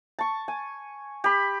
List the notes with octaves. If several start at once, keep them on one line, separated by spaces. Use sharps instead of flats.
A5 C#6
G#5
G4 B5